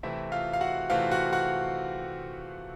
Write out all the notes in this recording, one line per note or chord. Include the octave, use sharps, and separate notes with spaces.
C3 E3 A3 C4 E4 E5
F4 F5
F5
F#4 F#5
C3 E3 A3 C4 F4 F5
F#4 F#5
F#4 F#5